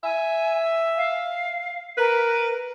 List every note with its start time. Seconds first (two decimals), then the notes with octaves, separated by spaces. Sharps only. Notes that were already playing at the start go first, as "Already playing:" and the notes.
0.03 E5 G#5
0.97 F5
1.97 A#4 B4